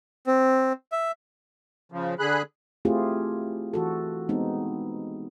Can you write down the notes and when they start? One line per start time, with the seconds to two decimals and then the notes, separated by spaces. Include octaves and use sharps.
0.27 C4
0.92 E5
1.92 C#3 F3
2.19 D3 G#4 B5 F#6
2.85 A3 C4 E4 F4 G4 G#4
3.74 E3 F#4 A4
4.29 G#3 B3 C4 D#4